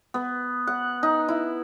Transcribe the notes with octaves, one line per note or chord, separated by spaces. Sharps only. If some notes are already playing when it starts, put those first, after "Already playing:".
B3
F#5
D#4
E4